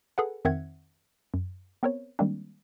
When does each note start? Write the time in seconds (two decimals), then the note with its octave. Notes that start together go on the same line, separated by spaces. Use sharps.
0.18 G#4 A4 B4 F#5
0.45 F2 D#3 C4 E5 F#5 G#6
1.34 F#2
1.83 B3 C4 A#4 C5 C#5
2.19 D#3 G3 G#3 A#3 C4 D4